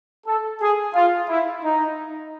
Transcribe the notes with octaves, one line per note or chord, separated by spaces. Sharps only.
A4
G#4
F4
E4
D#4